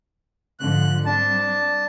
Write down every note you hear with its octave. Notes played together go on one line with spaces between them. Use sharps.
G#2 D3 F3 F#6
G3 C4 D4 A5